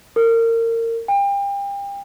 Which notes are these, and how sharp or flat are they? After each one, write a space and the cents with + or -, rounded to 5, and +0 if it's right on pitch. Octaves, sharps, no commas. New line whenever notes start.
A#4 -30
G5 +35